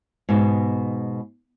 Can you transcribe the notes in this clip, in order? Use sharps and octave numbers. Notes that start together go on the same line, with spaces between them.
G#2 B2